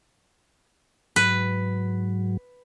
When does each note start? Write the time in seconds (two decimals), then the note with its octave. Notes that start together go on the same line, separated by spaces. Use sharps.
1.16 G#2 F#3 B4